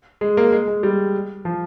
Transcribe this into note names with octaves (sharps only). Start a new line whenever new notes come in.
G#3
A#3
G#3
G#3
G3
F3